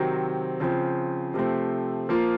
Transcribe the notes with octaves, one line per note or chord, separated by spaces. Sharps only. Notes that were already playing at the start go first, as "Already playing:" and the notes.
Already playing: C3 D#3 F#3 C4
C#3 F3 C4
C3 F3 A3 C4
F3 A#3 F4